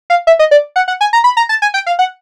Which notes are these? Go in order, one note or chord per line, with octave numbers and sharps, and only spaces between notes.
F5
E5
D#5
D5
F#5
F#5
G#5
A#5
B5
A#5
A5
G#5
G5
F5
F#5